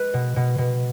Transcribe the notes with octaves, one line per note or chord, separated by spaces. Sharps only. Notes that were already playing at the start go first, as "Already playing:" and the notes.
Already playing: G#3 B4
B2
B2
B2